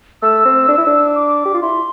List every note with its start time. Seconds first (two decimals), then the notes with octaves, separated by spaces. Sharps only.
0.22 A3 E6
0.45 C4
0.69 D4
0.77 E4
0.86 D4
1.15 D6
1.45 G4
1.54 F4
1.62 E4 C6